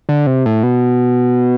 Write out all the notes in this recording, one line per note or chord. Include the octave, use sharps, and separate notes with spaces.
D3
C3
A2
B2